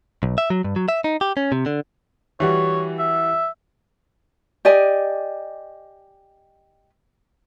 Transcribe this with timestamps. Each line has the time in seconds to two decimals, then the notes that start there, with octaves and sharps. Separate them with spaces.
0.23 B1
0.38 E5
0.50 F#3
0.64 G2
0.76 F#3
0.88 E5
1.04 D#4
1.21 G4
1.37 C#4
1.52 C3
1.66 D3
2.40 E3 G3 F#4 C#5
2.99 E5
4.65 G4 D5 D#5 G#5